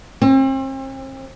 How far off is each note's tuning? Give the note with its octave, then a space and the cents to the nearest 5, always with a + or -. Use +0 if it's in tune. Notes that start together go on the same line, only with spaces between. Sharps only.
C4 +40